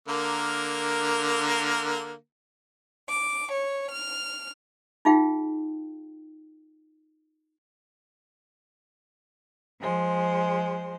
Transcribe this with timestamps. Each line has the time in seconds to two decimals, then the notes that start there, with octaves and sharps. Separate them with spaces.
0.08 D3 A#3 A#4
3.09 D6
3.51 C#5
3.91 F6
5.05 D#4 F4 G#4 F5 G5
9.80 F3 G#3 C5